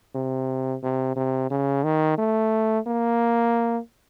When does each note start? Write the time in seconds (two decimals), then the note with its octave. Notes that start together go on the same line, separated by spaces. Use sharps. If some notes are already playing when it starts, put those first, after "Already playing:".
0.15 C3
0.83 C3
1.16 C3
1.50 C#3
1.84 D#3
2.18 A3
2.87 A#3